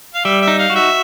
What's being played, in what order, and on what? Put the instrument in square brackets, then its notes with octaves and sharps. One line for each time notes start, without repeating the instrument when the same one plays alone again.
[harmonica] F5
[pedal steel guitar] G3 [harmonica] E5
[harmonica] E5
[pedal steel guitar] D#4
[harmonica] F5
[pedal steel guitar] F#4
[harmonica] E5